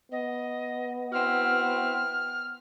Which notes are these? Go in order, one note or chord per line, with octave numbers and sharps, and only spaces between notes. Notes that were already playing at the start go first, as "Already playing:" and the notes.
B3 D#5
C4 E4 F#4 F6